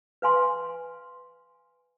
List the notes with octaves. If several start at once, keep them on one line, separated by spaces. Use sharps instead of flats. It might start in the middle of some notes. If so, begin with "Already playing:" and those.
B4 F5 G#5 C6